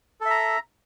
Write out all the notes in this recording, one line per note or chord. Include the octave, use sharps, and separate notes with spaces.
A4 E5 A#5